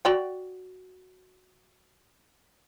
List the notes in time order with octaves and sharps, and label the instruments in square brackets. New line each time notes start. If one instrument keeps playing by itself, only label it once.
[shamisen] F#4 D5 G5